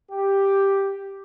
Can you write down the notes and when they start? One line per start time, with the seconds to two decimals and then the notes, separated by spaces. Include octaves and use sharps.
0.10 G4